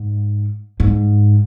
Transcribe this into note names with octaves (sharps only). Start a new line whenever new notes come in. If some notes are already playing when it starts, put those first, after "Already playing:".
Already playing: G#2
G#2